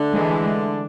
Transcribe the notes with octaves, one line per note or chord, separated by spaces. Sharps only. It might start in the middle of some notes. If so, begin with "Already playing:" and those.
Already playing: D3 A3 D4
E3 G#3